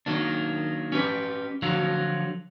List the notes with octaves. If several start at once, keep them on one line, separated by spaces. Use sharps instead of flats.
D#3 F#3 A#3 D4
C#4 G4 B4
D3 F3 F#3 F4 F#4